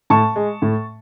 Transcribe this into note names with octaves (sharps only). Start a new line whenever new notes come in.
A2 A5 C#6
G#3
A2